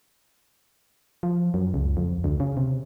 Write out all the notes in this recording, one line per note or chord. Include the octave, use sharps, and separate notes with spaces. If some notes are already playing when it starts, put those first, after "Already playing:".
F3
F#2
C#2
F2
D2
C#3
C3